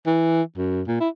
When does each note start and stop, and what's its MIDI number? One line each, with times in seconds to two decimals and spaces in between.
0.07 0.42 52
0.57 0.82 42
0.88 0.97 46
1.01 1.09 64